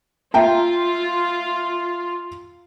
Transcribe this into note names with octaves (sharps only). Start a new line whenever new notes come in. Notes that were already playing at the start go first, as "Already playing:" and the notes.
F4 E5 G5 A#5